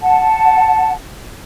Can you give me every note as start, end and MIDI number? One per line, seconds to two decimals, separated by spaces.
0.01 0.93 78
0.01 0.93 81